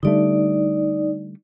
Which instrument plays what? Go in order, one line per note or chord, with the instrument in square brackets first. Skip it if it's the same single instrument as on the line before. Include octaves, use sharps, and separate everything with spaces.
[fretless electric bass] D3 G3 A3 [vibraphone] D#4 D5